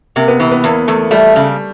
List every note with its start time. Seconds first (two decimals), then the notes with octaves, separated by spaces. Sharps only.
0.16 C3 A#3
0.28 B3
0.40 E3 B3
0.52 B3
0.64 E2 A#3
0.88 E2 A3
1.11 G3 A3
1.36 C#3